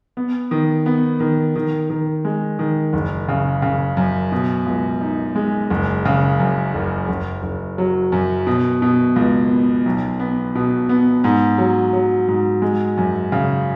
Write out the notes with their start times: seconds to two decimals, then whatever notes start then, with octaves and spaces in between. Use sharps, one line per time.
0.17 B3
0.51 D#3
0.86 B3
1.20 D#3
1.56 D#3
1.90 D#3
2.25 G#3
2.59 D#3
2.93 F#1
3.28 C#3
3.62 C#3
3.97 F#2
4.32 B2
4.66 C#2
5.01 D#4
5.36 G#3
5.70 F#1
6.05 C#3
6.39 F#2
6.74 F#1
7.09 F#1
7.43 F#1
7.78 F#3
8.12 F#2
8.47 B2
8.82 B2
9.16 C#2
9.51 B3
9.86 B1
10.20 B3
10.55 B2
10.89 B3
11.24 G#2
11.58 F#3
11.93 F#3
12.28 G#2
12.62 G#3
12.97 F#2
13.32 C#3